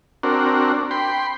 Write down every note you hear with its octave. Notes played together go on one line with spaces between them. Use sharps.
C4 D4 F#4 A#4
G5 B5 C6